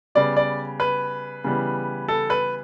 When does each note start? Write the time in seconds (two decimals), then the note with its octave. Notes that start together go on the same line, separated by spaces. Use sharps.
0.15 C#3 G3 B3 D5
0.36 D5
0.80 B4
1.44 C#3 E3 G3 B3
2.08 A4
2.30 B4